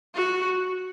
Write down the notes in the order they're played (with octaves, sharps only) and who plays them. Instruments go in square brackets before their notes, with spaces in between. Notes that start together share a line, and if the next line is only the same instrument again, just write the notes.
[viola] F#4